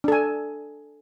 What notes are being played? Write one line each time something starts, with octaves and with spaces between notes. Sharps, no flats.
D4 A4 G#5